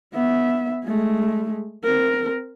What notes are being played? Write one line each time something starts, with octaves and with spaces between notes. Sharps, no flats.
B3 E5
G#3 A3
C4 A#4